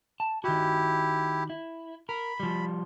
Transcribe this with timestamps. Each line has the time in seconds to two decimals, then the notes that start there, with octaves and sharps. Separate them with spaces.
0.20 A5
0.44 D#3 E4 F#4 G4
1.50 E4
2.09 A#4 B5
2.40 F3 G3